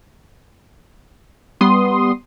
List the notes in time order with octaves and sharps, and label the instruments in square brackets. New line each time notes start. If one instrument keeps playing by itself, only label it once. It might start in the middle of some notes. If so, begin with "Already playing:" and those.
[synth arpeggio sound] G3 B3 C6 D#6